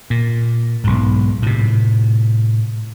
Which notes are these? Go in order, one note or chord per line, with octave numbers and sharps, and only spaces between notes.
A#2
B1 G#2
A2 C3